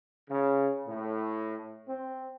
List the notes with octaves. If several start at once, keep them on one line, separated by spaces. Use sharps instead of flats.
C#3
A2
C4